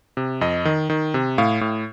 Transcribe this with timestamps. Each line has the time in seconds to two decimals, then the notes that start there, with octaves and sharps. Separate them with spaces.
0.17 C3
0.41 F2 D#5
0.65 D#3
0.90 D#3
1.14 C3
1.38 A2 F5
1.61 A2